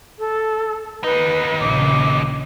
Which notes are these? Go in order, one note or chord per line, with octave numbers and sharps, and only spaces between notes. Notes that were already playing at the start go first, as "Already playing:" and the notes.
A4
D#2 D#4 B4
A#1 C#3 D6